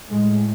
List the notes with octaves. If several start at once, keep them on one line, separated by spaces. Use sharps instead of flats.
A2 G#3